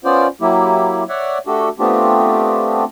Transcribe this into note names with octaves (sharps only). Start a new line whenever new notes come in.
B3 C#4 F4 C5 D5
F#3 A#3 E4 G4
C#5 D5 E5 F#5
A3 D4 F#4 G4 A4
A3 B3 C4 D4 F4 G4